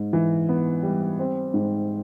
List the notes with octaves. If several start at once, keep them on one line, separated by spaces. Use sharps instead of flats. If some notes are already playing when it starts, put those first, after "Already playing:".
Already playing: G#2
E3
B3
G3
C4
G#2